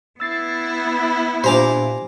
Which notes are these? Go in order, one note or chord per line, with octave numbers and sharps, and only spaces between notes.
B3 E4 E6 A6 C7
A#2 D4 F4 G4 C5 G#5 A#5 D6